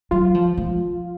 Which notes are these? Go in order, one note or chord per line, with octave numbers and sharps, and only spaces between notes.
F#3 F4
F3
F3